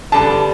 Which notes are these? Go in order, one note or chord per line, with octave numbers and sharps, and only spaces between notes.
D3 G3 B3 A5